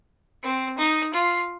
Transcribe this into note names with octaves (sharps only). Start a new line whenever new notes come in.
C4
D#4
F4